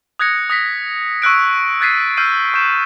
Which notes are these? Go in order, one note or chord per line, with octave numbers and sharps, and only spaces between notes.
D#6 F#6 G#6 A#6 C#7
D#6 A#6 B6
C#6 E6 F#6 D7
F#6 G#6 A6 B6 C7 D#7
E6 F6 G6 C7 D#7
C#6 G6 E7